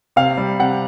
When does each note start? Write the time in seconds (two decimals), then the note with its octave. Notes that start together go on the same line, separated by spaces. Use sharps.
0.16 C3 F5
0.37 G3
0.59 C3 F#5